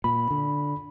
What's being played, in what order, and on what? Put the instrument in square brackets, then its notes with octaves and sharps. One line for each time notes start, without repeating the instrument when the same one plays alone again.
[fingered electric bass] A#2 [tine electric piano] B5
[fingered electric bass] D3